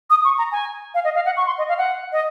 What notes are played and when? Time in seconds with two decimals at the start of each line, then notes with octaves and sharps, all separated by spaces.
0.10 D#6
0.24 C#6
0.38 A#5
0.52 G#5
0.94 F5
1.04 D#5
1.15 F5
1.26 F#5
1.37 C#6
1.47 C6
1.58 D#5
1.69 F5
1.78 F#5
2.12 D#5